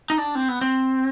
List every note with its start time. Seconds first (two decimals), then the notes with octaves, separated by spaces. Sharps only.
0.10 D#4
0.18 D4
0.35 C4
0.48 B3
0.61 C4